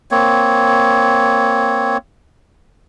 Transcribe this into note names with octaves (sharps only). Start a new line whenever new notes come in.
A#3 C4 C#5